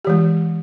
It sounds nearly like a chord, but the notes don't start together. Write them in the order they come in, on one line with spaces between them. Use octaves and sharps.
G4 E3 G#3